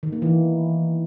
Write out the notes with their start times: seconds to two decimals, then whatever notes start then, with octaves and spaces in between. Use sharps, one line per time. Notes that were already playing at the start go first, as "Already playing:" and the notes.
0.03 D#3
0.12 A#3
0.22 E3